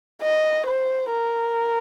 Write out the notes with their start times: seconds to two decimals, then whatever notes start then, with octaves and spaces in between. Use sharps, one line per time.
0.22 D#5
0.67 C5
1.11 A#4